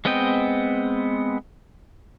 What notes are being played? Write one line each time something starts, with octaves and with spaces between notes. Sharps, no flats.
G#3 B3 C4 D#5 G5